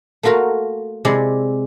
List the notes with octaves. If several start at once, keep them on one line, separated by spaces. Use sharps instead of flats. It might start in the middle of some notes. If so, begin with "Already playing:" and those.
A3 A#3 F4 F#4 A#4
C3 G#3 E4 D5